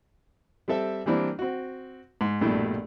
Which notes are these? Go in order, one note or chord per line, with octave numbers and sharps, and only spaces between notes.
G3 C4 A4 E5
E3 G3 A#3 C4 D4 E4
C4 F#4
G#2
A#1 G2 B2 A3 E4